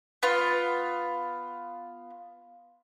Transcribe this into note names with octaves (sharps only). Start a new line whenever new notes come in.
B3 F4